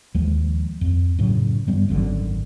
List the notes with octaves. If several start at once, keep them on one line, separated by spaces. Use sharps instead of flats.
D#2 F3 G#3
F2
F#2 A2 C#3 F#3
G2 G3 B3
G#1 F#2 D3